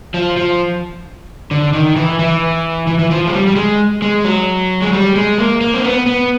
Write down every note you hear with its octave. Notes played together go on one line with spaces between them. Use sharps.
F3
F3
D3
D#3
E3
E3
E3
E3
F3
G#3
G3
G3
G#3
G#3
F#3
G#3
G3
G#3
A#3
A#3
C4
B3
B3